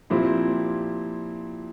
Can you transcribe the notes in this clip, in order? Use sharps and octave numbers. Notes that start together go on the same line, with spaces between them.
A#2 F3 C4 E4 G4